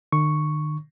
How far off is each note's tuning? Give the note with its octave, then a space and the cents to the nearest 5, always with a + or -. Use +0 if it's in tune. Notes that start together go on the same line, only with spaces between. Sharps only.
D#3 -45 C#6 +0